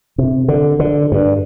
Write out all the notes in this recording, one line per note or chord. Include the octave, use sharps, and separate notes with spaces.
C3
D3
D3
G2